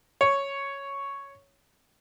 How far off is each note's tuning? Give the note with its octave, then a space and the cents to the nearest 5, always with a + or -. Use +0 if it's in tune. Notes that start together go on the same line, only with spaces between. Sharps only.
C#5 +0